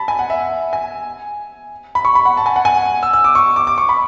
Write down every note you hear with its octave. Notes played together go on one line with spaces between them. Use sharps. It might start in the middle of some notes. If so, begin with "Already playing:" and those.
Already playing: A5 B5
G#5
F#5
E5
G#5
B5
C#6
B5
F#5
A5
G#5
F#5
G#5
E6
E6
D6
C#6
D6
D6
C#6
B5